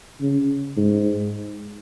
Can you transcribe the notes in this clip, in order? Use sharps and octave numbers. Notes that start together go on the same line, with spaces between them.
C#3
G#2